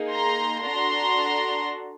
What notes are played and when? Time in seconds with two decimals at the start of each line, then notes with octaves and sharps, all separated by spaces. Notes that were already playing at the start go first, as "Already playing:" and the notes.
Already playing: A#3 D#4 G#4
0.10 A#5 C6
0.63 D4 F#4 A4 A#5 C6